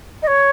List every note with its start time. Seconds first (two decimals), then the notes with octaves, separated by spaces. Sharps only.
0.22 D#5
0.27 C#5